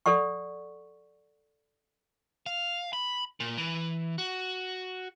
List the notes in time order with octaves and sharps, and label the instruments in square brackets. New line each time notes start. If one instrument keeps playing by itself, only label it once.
[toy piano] A4 D5 F#5 C#6
[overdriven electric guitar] F5
B5
A#2
E3
F#4